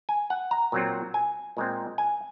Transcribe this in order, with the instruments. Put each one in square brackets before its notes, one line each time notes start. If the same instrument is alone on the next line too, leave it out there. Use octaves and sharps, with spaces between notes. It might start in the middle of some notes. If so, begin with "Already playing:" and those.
[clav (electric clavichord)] G#5
F#5
A#5
A#2 F#3 C4
G#5
A#2 G#3 C4
G#5